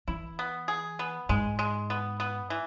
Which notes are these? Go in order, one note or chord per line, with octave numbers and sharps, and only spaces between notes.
E3 E4
B3
G#4
B3
G#2 G#3
G#3
B3
B3
E3